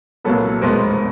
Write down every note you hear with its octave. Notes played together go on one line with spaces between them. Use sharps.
C2 A#2 F#3 B3 A4 B4
F1 E2 B2 G#3 B3 A#4 C5